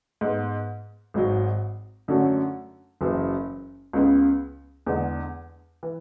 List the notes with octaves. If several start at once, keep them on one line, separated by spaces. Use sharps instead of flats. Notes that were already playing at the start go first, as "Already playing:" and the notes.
G#2 G#3 B3
G#1 G#2 F#3
F#2 D3 F#3 A3 C#4
F#1 F#2 E3
C#2 C#3 G#3 B3
E2 D3 G#3
E3